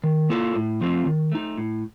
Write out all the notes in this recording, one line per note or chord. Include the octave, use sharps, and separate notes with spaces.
D#3
A#3 F4 A4
A2
F3 A3 C4 F4
D#3
A3 D#4
A2